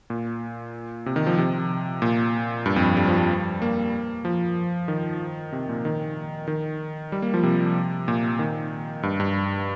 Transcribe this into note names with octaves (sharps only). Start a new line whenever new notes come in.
A#2
C3
D#3
F3
C3
A#2
G2
F2
G2
G3
F3
G3
A#3
F3
D#3
C3
A#2
D#3
D#3
G3
A#3
F3
C3
A#2
D#3
G2
G2